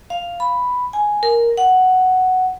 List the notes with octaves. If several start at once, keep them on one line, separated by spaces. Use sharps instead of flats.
F5
B5
G#5
A#4
F#5